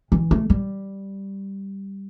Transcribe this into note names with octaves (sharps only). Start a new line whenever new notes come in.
E3
A3
G3